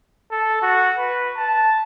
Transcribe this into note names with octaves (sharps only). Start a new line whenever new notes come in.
A4
F#4
B4
A5